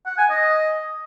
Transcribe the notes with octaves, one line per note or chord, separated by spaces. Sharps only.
F#5
G#5
D#5